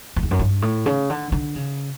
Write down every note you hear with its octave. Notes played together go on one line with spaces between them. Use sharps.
F#2
E2
F#2
G2
A2
C#3
D3
D3
C#3